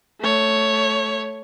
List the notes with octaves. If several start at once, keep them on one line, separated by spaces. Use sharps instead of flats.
A3 C#5